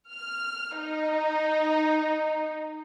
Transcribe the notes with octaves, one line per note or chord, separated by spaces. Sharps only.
F6
D#4